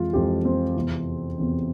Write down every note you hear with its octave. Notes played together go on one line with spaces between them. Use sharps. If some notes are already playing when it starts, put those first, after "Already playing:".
Already playing: F2 E3 G#3 F4
F2 E3 G#3 G4
C4
E2 C3 E3
E2 C3 E3